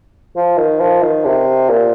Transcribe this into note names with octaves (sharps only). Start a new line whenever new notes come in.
F3
D#3
F3
D#3
C3
A#2